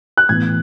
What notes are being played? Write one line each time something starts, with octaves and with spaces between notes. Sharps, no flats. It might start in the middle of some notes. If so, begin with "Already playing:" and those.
F#6
A2 E3 B3 G#6